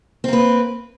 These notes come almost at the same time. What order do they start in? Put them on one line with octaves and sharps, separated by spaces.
C4 A#3 B4